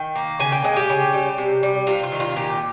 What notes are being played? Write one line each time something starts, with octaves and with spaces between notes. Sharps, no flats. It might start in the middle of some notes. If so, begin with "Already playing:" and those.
Already playing: D#3 G5
A#3
C#3 G#5
G5
G#3 D#5
G4
C#3
G3
C3
G3
C3 F4
F4
D#3
F4
A#2 G4